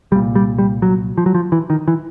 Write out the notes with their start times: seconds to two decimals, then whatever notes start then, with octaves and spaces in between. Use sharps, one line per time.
0.12 C2 G3
0.15 A#2
0.35 G3
0.58 G3
0.82 F#3
1.18 F3
1.26 F#3
1.35 F3
1.52 E3
1.70 D#3
1.88 E3